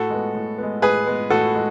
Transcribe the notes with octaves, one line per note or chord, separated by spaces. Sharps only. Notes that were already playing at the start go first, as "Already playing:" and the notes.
Already playing: A2 F#4 A4
G#3 B3
A2
G#3 B3
A2 G#4 B4
G#3 B3
A2 F#4 A4
G#3